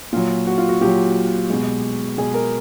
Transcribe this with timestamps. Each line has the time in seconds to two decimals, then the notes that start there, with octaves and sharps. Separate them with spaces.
0.12 A#2 F#3 F4
0.47 F#4
0.58 F4
0.69 F#4
0.81 A#2 F#3 G4
1.50 B2 G#3
2.18 B2 G#3 G#4
2.34 A#4